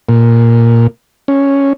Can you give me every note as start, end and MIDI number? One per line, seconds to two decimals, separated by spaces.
0.09 0.87 46
1.28 1.73 61